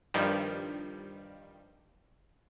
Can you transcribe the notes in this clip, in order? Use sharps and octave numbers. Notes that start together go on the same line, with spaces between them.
G2 D#3 F3 G3